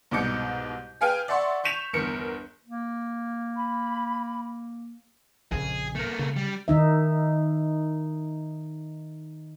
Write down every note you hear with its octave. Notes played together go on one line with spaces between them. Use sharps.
C2 G#2 B2 D6 G6 C#7
G#4 B4 F5 G5 G#5
D5 E5 F#5 C6 C#6
C#6 G6 B6 E7 F7
G1 E2 A#4 C#7
A#3
B5
A#1 F2 C#3 G#4
A3 A#3
C#3
G3
D#3 D#4 E5